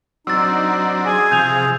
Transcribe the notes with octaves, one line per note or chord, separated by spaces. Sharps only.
F#3 C4 D4 D#4 E6 A6
G#4 G#5
C3 F3 G6 F7